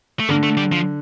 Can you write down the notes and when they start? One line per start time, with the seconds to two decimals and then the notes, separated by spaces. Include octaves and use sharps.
0.20 A3
0.29 D3 A#3
0.43 A3
0.57 G3
0.72 F3